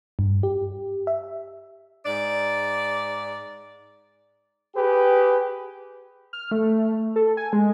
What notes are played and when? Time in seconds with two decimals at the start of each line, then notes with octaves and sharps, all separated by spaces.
0.19 G2
0.43 G4
1.07 E5
2.06 G#2 D5
4.76 G4 G#4 B4
6.33 F6
6.51 A3
7.16 A4
7.37 G#5
7.53 G#3